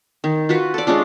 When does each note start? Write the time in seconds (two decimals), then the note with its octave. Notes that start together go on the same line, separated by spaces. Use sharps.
0.24 D#3
0.49 F4 F#4 B4
0.74 A4 D5
0.87 G#3 C#4 D4 F4